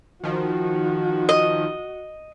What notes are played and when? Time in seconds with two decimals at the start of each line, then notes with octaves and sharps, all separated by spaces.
0.24 D#3 F3 F#4
1.29 D#5